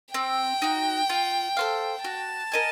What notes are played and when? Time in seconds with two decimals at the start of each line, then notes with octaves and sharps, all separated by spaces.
0.14 C4 G5
0.62 D#4 F#4
1.09 F4
1.57 A4 C5 F5
2.04 F#4 A5
2.52 A#4 D#5 G#5